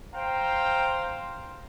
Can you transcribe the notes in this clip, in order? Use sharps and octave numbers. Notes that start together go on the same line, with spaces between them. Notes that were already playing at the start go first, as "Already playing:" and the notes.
C5 F5 G5 A#5 C6